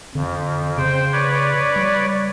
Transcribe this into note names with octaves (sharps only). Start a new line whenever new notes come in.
F2 D3
C#3 C5 G5
B4 C#5 D5
G3